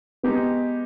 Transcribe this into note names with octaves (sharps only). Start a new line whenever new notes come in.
G#3 B3 D#4 G4